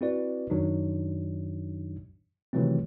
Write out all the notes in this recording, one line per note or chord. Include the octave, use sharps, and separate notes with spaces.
C4 E4 F#4 B4 D5
F#2 D#3 F#3 D4 D#4
C3 D#3 E3 F#3 A3 C4